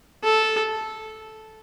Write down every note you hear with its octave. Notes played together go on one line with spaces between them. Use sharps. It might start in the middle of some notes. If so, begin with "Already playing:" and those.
A4